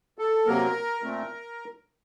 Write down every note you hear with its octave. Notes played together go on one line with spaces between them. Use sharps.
A4
C3 F#3 A#3 A#4
A#2 A3 C4